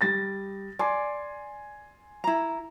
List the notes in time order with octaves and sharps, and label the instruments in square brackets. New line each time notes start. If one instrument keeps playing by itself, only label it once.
[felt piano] G3 A6 A#6
[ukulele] D5 [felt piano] G#5 C6
[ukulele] E4 A#5